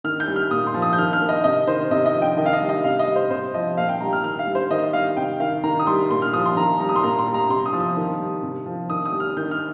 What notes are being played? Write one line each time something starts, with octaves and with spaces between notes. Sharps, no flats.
D#3 F6
G6
G3
F6
A#2 D#6
C6
F3
D#6
G6
D#3 F6
F6
A#3
D#5
C3 D#5
D#3 C5
C3 D#5
D#5
F3
G5
D#3 D#5
F5
D#5
G3
D#5
C3 F5
D#5
G3
C5
C3 C5
F3 D#5
A#2 F5
G5
G3 A#5
F6
D#3 F6
F5
G3
C5
D#3 D#5
G3 F5
C3 G5
D#3 F5
D#3 A#5
D#6
G3 C6
A#2 C6
F6
F3 D#6
C6
D#3 A#5
G3 A#5
D#6
C6
A#2 A#5
C6
G3
A#5
C3 C6
D#6
F3
D#6
D#3
G3
C3
F3
D#3 D#6
D#6
G3
F6
D#3 G6
F6